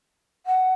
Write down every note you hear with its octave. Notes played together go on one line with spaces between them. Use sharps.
F#5